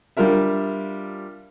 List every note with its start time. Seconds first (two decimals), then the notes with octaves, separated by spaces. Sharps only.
0.17 G3 D4 F4 A#4 E5